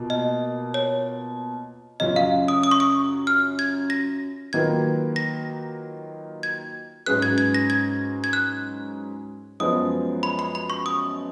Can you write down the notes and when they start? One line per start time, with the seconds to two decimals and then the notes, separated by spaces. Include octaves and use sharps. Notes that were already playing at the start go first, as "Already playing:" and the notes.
Already playing: B2 A#3 F4
0.10 D#5
0.74 C#5
2.00 F#2 C#3 F#3 C#4 F4 D#5
2.16 F5
2.48 D#6
2.63 D#6
2.71 C#6
2.80 D#6
3.27 F6
3.59 G#6
3.90 A#6
4.53 D#3 F#3 A#3 F4 B4 G#6
5.16 A#6
6.43 G#6
7.06 G#2 F#3 C#4 G#4 B4 F#6
7.22 G#6
7.38 G#6
7.54 A#6
7.70 G#6
8.24 G#6
8.33 F#6
9.60 F#2 F3 G#3 B3 D#6
10.23 B5
10.39 B5
10.55 B5
10.70 C#6
10.86 D#6